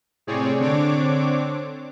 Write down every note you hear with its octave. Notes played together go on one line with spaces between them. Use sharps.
A2 C3 C4 G#4 C#5 D5
D3 C4 D4 C#5 D6